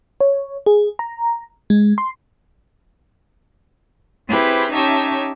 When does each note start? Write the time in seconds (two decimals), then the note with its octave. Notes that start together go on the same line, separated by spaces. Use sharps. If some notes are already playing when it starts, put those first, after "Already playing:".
0.21 C#5
0.66 G#4
0.99 A#5
1.70 G#3
1.98 C6
4.29 C4 E4 G4 G#4 B4 C5
4.72 C#4 D#4 G4 C#5 E5 A5